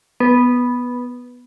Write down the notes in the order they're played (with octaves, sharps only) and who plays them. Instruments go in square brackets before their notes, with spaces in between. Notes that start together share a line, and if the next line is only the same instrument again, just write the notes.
[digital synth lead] B3